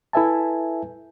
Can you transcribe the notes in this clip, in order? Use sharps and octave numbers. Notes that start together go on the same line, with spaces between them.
E4 A4 B4 E5 G#5 A5